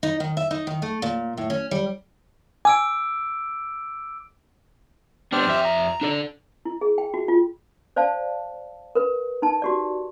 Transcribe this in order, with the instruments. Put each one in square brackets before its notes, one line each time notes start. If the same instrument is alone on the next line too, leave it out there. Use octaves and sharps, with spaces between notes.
[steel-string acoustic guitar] D#4
D#3
E5
D#4
D#3
A3
A#2
A2
C#4
G3
[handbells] G#5 [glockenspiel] D6 E6 D7
[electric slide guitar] B3 D4 [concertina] C4 G4 F6
[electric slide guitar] F2 E5
[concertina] A#5
[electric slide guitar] D4 A4 D5
[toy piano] E4
G#4
G5
F#4
F4
C5 D5 F5 A5
A#4 B4
D#4 A5
F#4 G4 D5